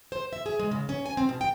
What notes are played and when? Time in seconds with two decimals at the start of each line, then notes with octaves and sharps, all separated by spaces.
0.12 C5
0.33 E5
0.46 G#4
0.59 G#3
0.71 C#3
0.89 C#4
1.06 G#5
1.17 C4
1.29 B2
1.41 G5